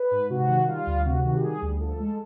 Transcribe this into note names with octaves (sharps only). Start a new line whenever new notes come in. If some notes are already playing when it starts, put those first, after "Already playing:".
Already playing: B4
G#2
C3 F#4
D#3
G3 F4
D2
C3 F#4
D#3 F#4
G4
G3 G#4
D2
F3 A4
G#3